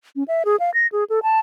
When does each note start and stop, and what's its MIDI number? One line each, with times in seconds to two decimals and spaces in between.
0.16 0.23 61
0.28 0.43 76
0.45 0.56 68
0.60 0.70 77
0.74 0.87 94
0.92 1.04 68
1.10 1.20 69
1.23 1.39 81